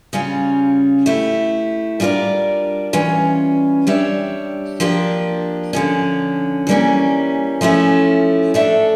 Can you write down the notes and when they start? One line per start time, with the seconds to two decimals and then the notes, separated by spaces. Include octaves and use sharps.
0.13 C#3 G3 C#4 F4
1.06 A3 E4 G4
2.00 G3 D4 F4 A#4 D5
2.93 E3 G3 C#4 F4
3.87 G3 D4 G4 C#5 E5
4.80 F3 A#3 D4 G4
5.73 D3 F3 C#4
6.67 E3 G3 A#3 C#4
7.61 F3 A3 C#4 E4
8.54 A3 D4 A4 E5